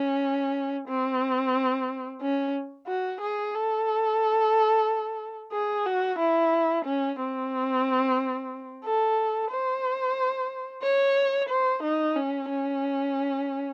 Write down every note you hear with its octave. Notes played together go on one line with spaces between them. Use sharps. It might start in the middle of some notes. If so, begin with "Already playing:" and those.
Already playing: C#4
C4
C#4
F#4
G#4
A4
G#4
F#4
E4
C#4
C4
A4
C5
C#5
C5
D#4
C#4
C#4